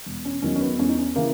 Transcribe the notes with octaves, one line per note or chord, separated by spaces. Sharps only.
E1
C#4
E2 D#3 F#3 C#4
C#4
B3
E2 C#4
D#4
C#4
C#3 E3 A#3